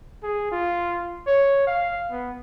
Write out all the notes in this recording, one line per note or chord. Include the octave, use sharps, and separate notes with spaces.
G#4
F4
C#5
F5
B3